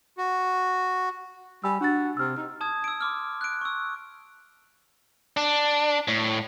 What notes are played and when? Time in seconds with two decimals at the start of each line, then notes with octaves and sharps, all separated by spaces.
0.18 F#4
1.64 G3 G#5 B5 E6
1.81 D4 F#4 A6
2.17 C3 E6 F6
2.37 D#4
2.61 A5 D#6 G#6
2.84 E6 D7
3.01 C6 D6 F6
3.41 F#6 D7
3.61 C#6 E6
5.37 D4
6.08 A2